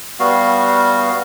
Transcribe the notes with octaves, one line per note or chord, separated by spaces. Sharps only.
G3 B3 F#4 F5